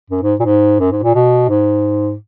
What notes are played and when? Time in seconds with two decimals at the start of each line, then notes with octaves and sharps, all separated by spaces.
0.10 F#2
0.22 G#2
0.40 A#2
0.45 G#2
0.80 F#2
0.92 G#2
1.03 A#2
1.15 B2
1.49 G#2